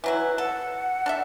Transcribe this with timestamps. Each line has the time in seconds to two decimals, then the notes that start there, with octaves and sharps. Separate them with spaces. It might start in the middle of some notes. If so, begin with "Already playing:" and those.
0.04 E3 F#3 E4 B4
0.38 A4 F#5
1.06 D4 A4 E5